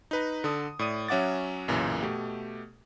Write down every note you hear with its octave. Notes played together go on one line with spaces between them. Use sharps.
D#4 B4 A#5
D3 A4 D#6
A2 D5 D#6 D#7
F#3 C#4 E5 F#5 D6 A6
B1 F#2 A#2 C#3 E3
B2 A3 G4